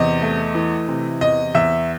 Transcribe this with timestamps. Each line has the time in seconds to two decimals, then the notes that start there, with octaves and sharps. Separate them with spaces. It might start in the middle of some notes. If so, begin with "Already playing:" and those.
Already playing: E2 C3 D#5
0.22 A3
0.55 E3
0.88 C3
1.21 E2 D#5
1.55 E2 E5